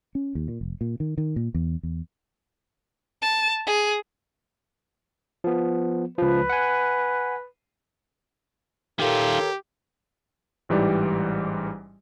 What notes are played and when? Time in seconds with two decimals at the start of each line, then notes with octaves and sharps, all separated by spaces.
0.15 C#4
0.35 D#2
0.48 A#2
0.61 F1
0.81 A#2
1.00 D#3
1.18 D#3
1.36 A#2
1.54 E2
1.83 E2
3.22 A5
3.67 G#4
5.44 F3 B3
6.18 C#2 F3 B4
6.50 F#5 G#5
8.99 D#3 F4 G4 A4 A#4 C#5
10.69 A1 G#2 E3 G3 G4 D5